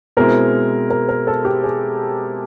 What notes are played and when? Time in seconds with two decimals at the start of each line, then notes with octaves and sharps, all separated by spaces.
0.17 B2 G#3 C4 E4 A#4
0.90 A#4
1.09 A#4
1.27 A4
1.45 G4
1.64 G#4